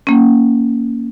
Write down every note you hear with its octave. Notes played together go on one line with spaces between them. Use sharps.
A#3 C#4